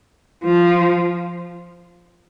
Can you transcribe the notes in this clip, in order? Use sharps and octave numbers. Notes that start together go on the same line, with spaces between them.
F3